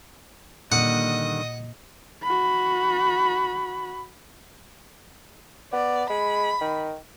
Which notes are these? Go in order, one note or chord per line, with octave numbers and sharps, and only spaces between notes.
A#2 D3 D#3 G3 D#5 F#5 D#6
F#4 B5
B3 D5
G#3 B5
D#3